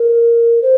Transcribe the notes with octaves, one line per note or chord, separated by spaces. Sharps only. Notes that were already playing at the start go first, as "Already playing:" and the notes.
Already playing: A#4
C5